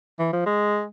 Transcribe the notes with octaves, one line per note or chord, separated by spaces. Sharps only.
E3
F3
G#3